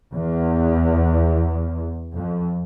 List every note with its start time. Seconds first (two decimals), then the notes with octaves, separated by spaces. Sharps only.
0.13 E2
2.15 F2